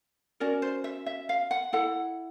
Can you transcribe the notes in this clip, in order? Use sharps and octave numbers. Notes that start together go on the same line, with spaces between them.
C#4 F#4 A#4 D5
C5
E5
E5
F5
F#5
E4 A4 F#5